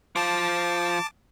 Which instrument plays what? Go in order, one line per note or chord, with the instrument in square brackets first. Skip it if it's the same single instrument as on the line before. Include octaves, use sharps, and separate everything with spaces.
[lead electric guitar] F3 F4 [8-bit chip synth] A5 D6